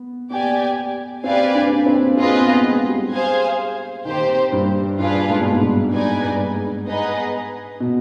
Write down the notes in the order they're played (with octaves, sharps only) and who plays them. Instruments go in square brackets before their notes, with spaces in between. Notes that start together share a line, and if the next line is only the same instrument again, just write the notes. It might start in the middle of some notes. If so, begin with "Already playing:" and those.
Already playing: [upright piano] B3
[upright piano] B3 [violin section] G4 D5 G#5
[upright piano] C4 [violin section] G4 B4 D5 F5 G#5
[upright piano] D4
C4
[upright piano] C4 [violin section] F4 G#4 B4 D#5
[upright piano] B3
G#3
G3
[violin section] G#4 C5 F5 G#5
[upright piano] D#3 [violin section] C4 G4 C5
[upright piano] G2
[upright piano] G2 [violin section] D4 F4 G#4 B4 F5
[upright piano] G#2
B2
G#2
G2
[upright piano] G2 [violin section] D#4 B4 D5 G#5
[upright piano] G2
G#2
[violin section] B3 D#4 G#4 B4 D#5
[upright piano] B2